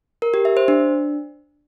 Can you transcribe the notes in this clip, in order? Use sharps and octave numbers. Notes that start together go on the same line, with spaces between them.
A#4
G4
E5
C5
D4